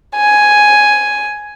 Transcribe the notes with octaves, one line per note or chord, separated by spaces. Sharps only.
G#5